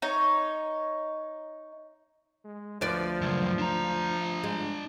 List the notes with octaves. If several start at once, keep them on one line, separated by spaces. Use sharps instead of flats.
D#4 C#5
G#3
D2 F3 B4 D5
C#2 F#2
D4 A#5
G#3